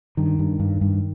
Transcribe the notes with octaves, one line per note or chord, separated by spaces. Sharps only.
G2 D#3
G2
G2
G2